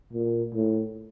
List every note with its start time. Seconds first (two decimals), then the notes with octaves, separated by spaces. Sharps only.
0.13 A#2
0.55 A2